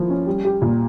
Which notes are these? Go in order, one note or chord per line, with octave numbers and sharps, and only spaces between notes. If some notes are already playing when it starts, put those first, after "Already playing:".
Already playing: F3 A#3 E4
C#4
G3
G4
A#2